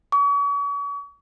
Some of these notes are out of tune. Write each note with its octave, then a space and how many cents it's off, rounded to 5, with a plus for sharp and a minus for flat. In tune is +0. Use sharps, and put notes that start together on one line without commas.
C#6 +40